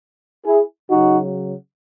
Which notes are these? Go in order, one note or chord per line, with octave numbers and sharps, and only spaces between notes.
E4 G#4
C#3 F#3 D#4 F#4